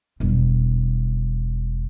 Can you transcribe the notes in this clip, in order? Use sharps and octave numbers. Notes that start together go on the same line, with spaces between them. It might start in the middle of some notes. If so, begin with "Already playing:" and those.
E1 G3